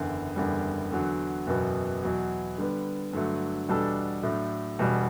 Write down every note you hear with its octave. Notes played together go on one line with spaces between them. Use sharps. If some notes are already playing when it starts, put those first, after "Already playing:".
Already playing: F#1 E2 D3
F#1 E2 D3 G3
E2 D3 F#3
F#1 E2 B2 F#3 B3
E2 B2 F#3
D3 G3 B3
G2 D3 F#3 A3
E2 B2 G3 D4 A4
A2 F#3 A3 D4
E1 E2 B2 G3